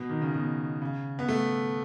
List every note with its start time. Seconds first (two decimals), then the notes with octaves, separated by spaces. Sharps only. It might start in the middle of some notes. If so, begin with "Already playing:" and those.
Already playing: B2
0.09 D#3
0.21 C#3
0.34 B2
0.82 C#3
1.19 B3
1.28 A3